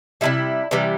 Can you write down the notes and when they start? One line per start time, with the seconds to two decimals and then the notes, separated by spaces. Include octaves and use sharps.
0.21 C3 E3 G3 E4
0.71 C3 E3 G3